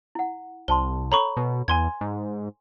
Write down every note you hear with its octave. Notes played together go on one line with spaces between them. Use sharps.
E4 F#5
C2 C5 A5 C6 G7
A4 C#5 A#5 B5 C#6
B2
E2 G#5 C6 G#6
G#2